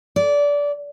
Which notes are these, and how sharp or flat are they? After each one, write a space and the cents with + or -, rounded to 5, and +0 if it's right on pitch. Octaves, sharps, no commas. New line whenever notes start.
D5 -20